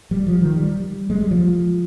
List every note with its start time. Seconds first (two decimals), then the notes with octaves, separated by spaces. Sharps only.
0.11 G3
0.27 F3
0.41 D#3
0.56 G3
1.10 G#3
1.21 G3
1.31 F3